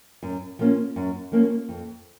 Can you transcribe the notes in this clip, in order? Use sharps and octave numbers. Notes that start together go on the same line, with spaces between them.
F#2
F3 A#3 C#4
F#2
F3 A#3 C#4
F2